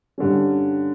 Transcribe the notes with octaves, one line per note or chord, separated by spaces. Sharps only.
G2 D3 G3 C#4